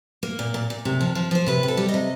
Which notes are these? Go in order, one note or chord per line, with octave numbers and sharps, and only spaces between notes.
A#3
A#2
A#2
A#2
C3
F3
F3
F3 C5
C3 B4
C3
A4
G3
D#5
C3